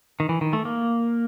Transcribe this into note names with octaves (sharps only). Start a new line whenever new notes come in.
D#3
E3
D#3
A3
A#3